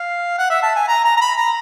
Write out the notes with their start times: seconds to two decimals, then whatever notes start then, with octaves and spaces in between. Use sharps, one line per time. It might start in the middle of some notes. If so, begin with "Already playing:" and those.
Already playing: F5
0.38 F#5
0.50 E5
0.63 A5
0.75 G#5
0.88 A#5
1.05 A#5
1.17 A#5
1.21 B5
1.38 A#5